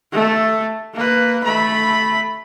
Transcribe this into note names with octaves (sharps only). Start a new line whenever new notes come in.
A3 A4
A#3 B4
A3 B5